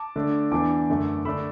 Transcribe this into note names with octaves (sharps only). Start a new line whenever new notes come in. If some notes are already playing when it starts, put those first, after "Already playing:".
Already playing: A5 D6
D3 A3 D4
E2 E3 D4 A5 D6
F#2 D3 A3
D3 A3 D4 B5 E6